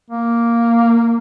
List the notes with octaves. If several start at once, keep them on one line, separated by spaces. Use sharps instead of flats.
A#3